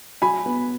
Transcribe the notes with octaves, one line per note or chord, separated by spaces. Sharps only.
F#3 G#5 B5
B3